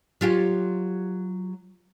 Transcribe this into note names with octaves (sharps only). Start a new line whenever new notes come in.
F#3 F4 G4